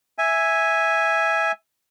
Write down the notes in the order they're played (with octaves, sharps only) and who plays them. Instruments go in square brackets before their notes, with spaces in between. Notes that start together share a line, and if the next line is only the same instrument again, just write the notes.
[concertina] E5 G#5